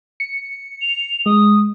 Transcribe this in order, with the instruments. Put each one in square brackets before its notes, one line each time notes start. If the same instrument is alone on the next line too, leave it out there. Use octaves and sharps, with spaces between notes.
[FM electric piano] C#7
[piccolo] F7
[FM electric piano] G#3 [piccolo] D#6